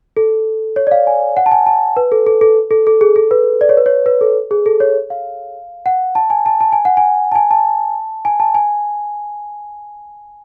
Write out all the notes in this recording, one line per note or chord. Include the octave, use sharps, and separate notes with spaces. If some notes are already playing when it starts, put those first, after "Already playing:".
A4
C#5
D5
F5
G#5
F#5
A5
G#5
A5
B4
A4
A4
A4
A4
A4
G#4
A4
B4
D5
C#5
B4
C#5
B4
A4
G#4
A4
C#5
F5
F#5
A5
G#5
A5
A5
G#5
F#5
G#5
A5
G#5
A5
G#5
A5
G#5